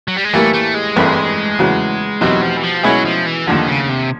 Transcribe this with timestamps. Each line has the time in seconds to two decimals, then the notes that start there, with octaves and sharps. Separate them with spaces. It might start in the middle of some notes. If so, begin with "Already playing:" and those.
0.08 F#3
0.17 G3
0.24 G#3
0.34 A2 E3 G3 A3 A#3
0.54 A3
0.75 G#3
0.96 A1 G2 E3 A3 C4
1.59 E2 C#3 F#3
2.21 E2 B2 F#3 G3 C4 D#4
2.42 F3
2.57 E3
2.63 F3
2.83 B2 F#3 G#3 C#4 E4 G#4
3.05 F3
3.26 E3
3.47 D#2 D3 D#3 F3
3.67 C#3
3.89 C3